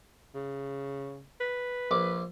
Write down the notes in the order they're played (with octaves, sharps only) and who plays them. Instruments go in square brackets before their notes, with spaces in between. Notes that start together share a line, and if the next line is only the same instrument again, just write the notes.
[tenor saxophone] C#3
B4
[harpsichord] A#1 D6